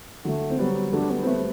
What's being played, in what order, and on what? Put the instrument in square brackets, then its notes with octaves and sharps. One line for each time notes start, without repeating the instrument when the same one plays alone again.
[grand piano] D3 F#3 [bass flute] A3
[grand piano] C4
[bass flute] F#3 [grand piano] G3 B3
[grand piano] F#3 A3 [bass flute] D4
[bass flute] B3
[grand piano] C4
[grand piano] G3 B3 [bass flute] A3